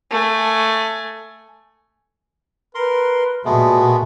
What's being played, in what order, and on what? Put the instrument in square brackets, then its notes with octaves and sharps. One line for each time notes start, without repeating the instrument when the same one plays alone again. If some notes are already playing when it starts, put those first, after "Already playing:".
[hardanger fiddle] A3 G#5
[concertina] A#4 C6 [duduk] B4
[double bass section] A#2 [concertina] G#3 A3 B3 [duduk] F#4